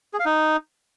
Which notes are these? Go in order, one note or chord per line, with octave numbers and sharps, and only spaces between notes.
G#4
F5
D#4